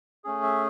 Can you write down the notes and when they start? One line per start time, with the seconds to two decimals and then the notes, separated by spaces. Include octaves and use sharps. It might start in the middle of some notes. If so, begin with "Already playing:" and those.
0.24 A3 C#4 G#4
0.43 E5